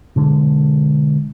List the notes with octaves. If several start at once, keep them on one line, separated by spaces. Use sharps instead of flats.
B2 D3 G#3